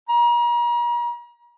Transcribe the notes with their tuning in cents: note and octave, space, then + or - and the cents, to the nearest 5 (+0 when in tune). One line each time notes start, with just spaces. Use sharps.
A#5 +40